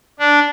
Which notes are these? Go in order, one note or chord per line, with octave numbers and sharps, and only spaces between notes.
D4